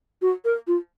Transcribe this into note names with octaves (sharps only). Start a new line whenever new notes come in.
F#4
A#4
F4